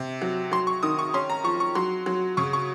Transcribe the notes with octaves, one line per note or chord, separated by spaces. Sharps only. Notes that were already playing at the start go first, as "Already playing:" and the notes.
Already playing: C3
F#3
F#3 C6
C#6
D#3 D#6
C#6
C#4 C6
A#5
F3 C#6
C#6
F#3 C6
F#3
C#3 C#6
C#6